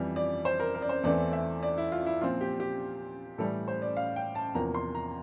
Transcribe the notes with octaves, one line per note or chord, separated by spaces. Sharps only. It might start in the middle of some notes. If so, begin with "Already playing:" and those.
Already playing: F2 E3 G3
D5
C5
A#4
A#4
D5
C5
E2 E3 A3 C4 D5
E5
D5
E4
F4
E4
A#2 F3 C4 F4
G4
G4
A2 E3 G3 A4
C5
D5
F5
G5
A5
E2 C3 F3 A#3 A#5
C6
A#5